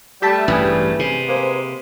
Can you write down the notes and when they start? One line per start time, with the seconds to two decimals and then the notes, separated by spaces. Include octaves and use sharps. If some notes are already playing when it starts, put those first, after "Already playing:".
0.22 G3 A3 G4 E5 A5
0.48 A1 G2 G#4 B4
0.99 C3
1.28 G#3 A#3 C5